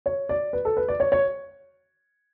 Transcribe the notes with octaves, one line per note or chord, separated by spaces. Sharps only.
C#5
D5
B4
A4
B4
D5
C#5
C#5